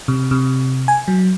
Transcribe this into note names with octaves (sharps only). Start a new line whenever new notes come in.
C3
C3
G#5
F#3